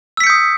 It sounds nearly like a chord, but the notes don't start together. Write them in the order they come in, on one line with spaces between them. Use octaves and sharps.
E6 B6 C#7 G6 D#6